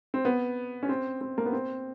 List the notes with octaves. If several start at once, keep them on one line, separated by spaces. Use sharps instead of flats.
C4
B3
C#4
C4
C4
A#3
B3
C4